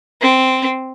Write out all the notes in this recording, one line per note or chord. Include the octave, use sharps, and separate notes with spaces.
C4